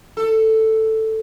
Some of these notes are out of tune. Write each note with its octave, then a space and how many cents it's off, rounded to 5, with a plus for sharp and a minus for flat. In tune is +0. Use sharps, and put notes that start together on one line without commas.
A4 +5